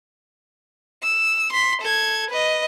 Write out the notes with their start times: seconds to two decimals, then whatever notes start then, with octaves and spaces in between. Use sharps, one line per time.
1.03 E6
1.52 C6 B6
1.81 A4 G#6
2.30 B4 D#5